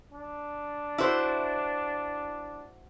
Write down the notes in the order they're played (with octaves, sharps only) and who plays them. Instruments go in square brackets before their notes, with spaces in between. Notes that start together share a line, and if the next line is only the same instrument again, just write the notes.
[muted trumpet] D4
[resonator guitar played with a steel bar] E4 F#4 C5